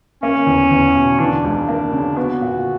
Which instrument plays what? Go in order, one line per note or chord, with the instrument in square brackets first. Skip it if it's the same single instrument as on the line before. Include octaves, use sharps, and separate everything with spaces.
[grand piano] A#3 [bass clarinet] C#4
[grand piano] E2
E2
B2
[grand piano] E3 [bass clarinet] D4
[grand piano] C#2
A#3
C#3
[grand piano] B3 [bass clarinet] F#4
[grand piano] A#2